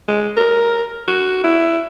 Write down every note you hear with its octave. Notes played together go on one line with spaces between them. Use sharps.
G#3
A#4
F#4
E4